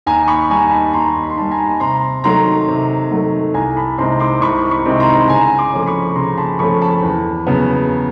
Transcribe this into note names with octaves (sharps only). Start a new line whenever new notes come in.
D#2 G#5 A#5
B5 C#6
G3 G#5 A#5
D#3
A5 B5
D#2 A#5 C6
B5
C6
D#3 G3 A5 B5
G#5 A#5
C3 A#5 C6
D#3 F#3 A3 A#5 C6
C3
D#3 F#3 A3
C2 G#5 A#5
A5 B5
C3 D#3 G#3 C4 A#5 C6
C6 D6
C2 B5 C#6
B5 C#6
C3 D#3 G#3 C4
A#5 C6
C#3 G#5 A#5
C6 D6
F3 A3 C#4
B5 C#6
C#3 A#5 C6
A5 B5
F3 A3 C#4 B5 C#6
A5 B5
E2
C#3 F#3 B3